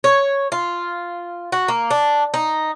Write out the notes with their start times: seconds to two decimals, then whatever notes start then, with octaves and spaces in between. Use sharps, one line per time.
0.04 C#5
0.52 F4
1.52 F#4
1.68 A#3
1.90 D4
2.34 D#4